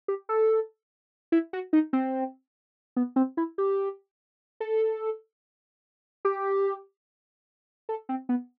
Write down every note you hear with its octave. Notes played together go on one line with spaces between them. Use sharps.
G4
A4
E4
F#4
D#4
C4
B3
C4
E4
G4
A4
G4
A4
C4
B3